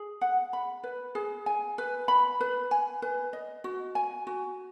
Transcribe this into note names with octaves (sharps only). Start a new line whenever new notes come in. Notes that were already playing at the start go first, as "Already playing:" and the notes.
Already playing: G#4
F#5
B5
B4
G#4
G#5
B4
B5
B4
G#5
B4
D#5
F#4
G#5
F#4